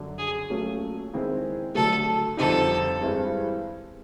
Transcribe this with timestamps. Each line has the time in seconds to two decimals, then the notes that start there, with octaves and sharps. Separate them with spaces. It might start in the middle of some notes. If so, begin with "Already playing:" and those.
Already playing: F#2 D3 F#3
0.19 G#4
0.50 A#2 F#3 A3 C#4
1.13 D#3 G#3 C4 E4 G#4
1.75 D3 F#3 A3 A4
2.37 F2 D3 G3 C4 D#4 A4
3.00 G2 E3 G#3 C4